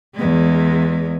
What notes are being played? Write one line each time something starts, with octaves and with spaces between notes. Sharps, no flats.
E2 G#3